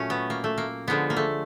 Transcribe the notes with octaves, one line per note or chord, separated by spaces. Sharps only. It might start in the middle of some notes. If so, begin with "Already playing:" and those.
Already playing: A#2 F#3 A3 C#4
B3
A#3
A3
A#3
D3 F3 G#3 B3
A#3
A3